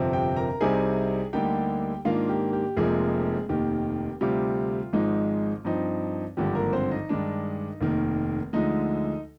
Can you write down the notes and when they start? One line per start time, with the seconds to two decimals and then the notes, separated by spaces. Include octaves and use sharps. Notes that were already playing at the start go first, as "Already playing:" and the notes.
Already playing: G1 F2 C3 F3 C4
0.13 G4 G5
0.36 A#4 A#5
0.61 C2 C3 G3 C4 D#4 G#4 G#5
1.33 D2 D3 G3 A#3 D#4 G4 G5
2.05 G#2 D#3 A#3 D4 F4 F5
2.29 G4
2.53 G4
2.77 F1 F2 C3 F3 G#3 A#3 G#4
3.49 F1 D#2 D#3 G4
4.21 D2 C3 G3 F4
4.93 G#1 G#2 F3 G#3 D#4
5.65 G2 F3 C4 D#4
6.37 G#1 G2 D3 F3 G4
6.55 A#3 A#4
6.73 C4 C5
6.91 D#4 D#5
7.09 G2 D#3 G#3 D4
7.81 F1 D#2 D#3
8.53 D2 D3 F3 G#3 D#4 D#5